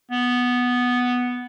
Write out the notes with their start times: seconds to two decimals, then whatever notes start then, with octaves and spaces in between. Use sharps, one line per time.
0.11 B3